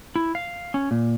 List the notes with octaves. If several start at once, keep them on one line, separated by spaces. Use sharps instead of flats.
E4
F5
C#4
A#2